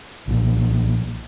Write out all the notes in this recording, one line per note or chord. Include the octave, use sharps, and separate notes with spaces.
B1 A#2